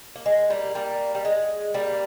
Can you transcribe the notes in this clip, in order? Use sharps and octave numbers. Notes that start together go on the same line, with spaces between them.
A#3
G#3
G3 A#3
G3 A#3
G3
G#3
G3 A#3